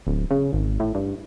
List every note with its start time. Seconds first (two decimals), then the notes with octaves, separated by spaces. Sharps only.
0.07 D1
0.31 C#3
0.53 G#1
0.80 A2
0.95 G2